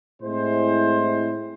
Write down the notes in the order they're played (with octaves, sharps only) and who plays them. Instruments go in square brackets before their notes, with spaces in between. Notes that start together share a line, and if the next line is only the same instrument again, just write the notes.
[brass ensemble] A2 G#3 C4 E4 C5